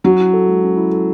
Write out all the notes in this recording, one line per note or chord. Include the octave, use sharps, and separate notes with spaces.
F#3 C#4
E4
A4
G#3
C#4
E4
A4